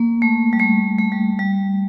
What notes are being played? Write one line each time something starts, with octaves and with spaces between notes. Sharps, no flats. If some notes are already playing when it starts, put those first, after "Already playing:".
Already playing: A#3
A3
G3
A3
A3
G3
G3